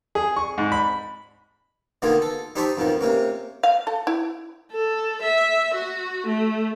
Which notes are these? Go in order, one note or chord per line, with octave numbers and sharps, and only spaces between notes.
G#4
C#6
G#2
B5
B2 D3 D#3 A#3 F4 G#4
A4
D#4 G4 C5 E5 A5 C#6
F2 B2 D#3 F3
C3 A#3 C#4
F5
A4
E4
A4
E5
F#4
A3